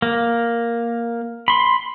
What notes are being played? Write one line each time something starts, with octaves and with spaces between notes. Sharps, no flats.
A#3
B5 C6